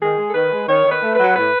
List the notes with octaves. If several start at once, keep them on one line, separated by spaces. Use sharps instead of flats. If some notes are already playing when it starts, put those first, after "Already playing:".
D#3 G#4
G#3
A4
D#3 B4
G#3
D#3 C#5
D#3
B4
A3
B4
F#3
A2 B4